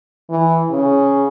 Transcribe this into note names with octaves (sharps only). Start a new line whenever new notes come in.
E3
C#3